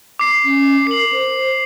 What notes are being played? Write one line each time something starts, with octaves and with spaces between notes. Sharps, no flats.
D6 C7
C#4
A#4 C7 F#7
C5